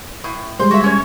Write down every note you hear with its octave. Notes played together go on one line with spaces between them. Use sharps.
A2
G3 G#3 C5
F#4 E5
C#4 C#5